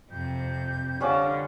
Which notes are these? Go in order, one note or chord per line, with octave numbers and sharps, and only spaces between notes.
F2 C3 G6
D3 G3 C#4 F4 F#5 D6